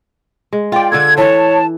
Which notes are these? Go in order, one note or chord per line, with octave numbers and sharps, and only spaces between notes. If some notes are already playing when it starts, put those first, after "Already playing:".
G#3
F4 D5 G5
D3 D4 A4 G#6
E3 C#5 A5